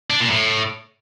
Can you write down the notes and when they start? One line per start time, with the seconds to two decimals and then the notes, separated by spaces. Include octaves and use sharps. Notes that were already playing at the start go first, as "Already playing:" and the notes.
0.10 D4
0.20 A#2
0.30 A2